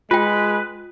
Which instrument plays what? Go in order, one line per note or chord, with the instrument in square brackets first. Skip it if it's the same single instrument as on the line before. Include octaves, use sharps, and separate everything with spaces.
[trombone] G#3 [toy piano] F4 G5 [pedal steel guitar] B4